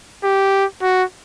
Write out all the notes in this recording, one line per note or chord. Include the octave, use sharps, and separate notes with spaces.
G4
F#4